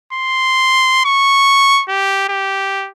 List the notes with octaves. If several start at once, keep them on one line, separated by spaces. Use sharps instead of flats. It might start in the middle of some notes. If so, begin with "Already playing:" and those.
C6
C#6
G4
G4